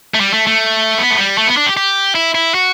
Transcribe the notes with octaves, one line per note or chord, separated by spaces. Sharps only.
A3
G3
A3
A3
B3
A3
G3
A3
B3
D4
G4
G4
E4
E4
F#4